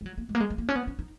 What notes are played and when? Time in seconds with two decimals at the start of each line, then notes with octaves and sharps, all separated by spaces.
0.01 G#3
0.06 F#3
0.18 A#3
0.29 G#3
0.35 A#3
0.40 G#3
0.50 G#3
0.58 A#3
0.69 C#4
0.76 B3
0.87 C#4
0.99 D#4